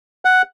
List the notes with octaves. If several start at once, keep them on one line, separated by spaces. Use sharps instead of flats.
F#5